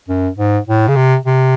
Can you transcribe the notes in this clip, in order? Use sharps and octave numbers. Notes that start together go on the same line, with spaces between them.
F#2
G#2
A2
C#3
C3
C3